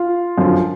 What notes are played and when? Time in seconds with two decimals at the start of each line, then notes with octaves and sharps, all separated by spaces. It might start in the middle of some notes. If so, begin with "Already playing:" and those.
Already playing: F4
0.38 F#2 D3 F3